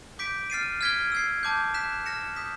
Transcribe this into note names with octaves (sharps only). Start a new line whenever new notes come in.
D6 G6 B6 D7
F6 A6 C7 D#7
F6 G#6 B6 D7 G7
E6 G#6 C7
A5 D6 G6
F#6 B6 E7
F6 A#6 C#7 E7
D#6 G6 B6